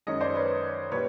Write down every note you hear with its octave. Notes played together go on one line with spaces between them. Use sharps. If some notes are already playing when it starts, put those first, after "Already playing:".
F#2 D#3 G#3 C#5 D#5
C5 D5
B4 C#5
A#2 G3 B4 C#5